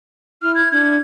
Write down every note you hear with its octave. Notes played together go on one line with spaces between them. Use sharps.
E4 F6
G#6
D4 G#6